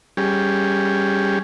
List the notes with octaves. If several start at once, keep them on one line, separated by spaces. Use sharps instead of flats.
G3 C#4 G4 G#4